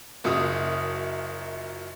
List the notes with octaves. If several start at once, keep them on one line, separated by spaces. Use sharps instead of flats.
F#1 F#2 F4 D#6